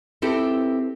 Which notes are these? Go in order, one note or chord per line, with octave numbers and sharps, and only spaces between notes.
C4 E4 G4 A4 B4